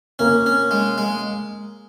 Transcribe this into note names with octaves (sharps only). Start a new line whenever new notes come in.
A#3 C#4
C#4
G#3
G#3